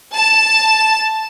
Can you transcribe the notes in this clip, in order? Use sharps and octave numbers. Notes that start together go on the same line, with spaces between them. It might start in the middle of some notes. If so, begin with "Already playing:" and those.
A5